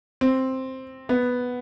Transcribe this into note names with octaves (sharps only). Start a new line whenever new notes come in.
C4
B3